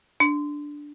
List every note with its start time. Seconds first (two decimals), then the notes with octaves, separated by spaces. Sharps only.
0.20 D4